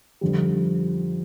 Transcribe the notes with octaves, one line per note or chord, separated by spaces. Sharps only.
F2 D3 G3